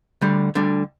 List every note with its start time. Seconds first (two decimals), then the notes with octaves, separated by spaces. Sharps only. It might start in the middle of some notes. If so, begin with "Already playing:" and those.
0.21 D2 D3 G3
0.55 D2 D3 G3